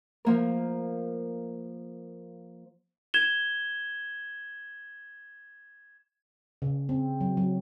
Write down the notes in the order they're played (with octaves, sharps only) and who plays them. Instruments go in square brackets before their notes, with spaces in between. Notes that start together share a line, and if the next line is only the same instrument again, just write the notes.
[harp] F3 A#3 A#4
[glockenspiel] G#6 E7 G7
[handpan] C#3
C4
F#3
F#3